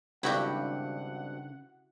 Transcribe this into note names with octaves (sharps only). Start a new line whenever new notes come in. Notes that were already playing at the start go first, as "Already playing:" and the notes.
G#1 G2 C#3 D4 E4 F#4 G4 F#5